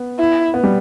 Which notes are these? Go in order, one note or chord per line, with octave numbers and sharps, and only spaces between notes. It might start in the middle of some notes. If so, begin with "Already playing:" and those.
Already playing: B3
E4
B3
G3